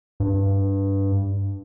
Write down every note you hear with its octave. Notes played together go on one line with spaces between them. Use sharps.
G2